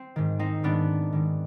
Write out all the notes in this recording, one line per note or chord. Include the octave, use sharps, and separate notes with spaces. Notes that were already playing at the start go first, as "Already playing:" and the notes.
Already playing: C4
G#2 D#3
C4 D#4
G#2 D#3 B3 D4
G#2 D#3